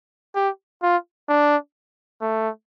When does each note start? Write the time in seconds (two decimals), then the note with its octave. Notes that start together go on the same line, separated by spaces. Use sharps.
0.35 G4
0.83 F4
1.29 D4
2.21 A3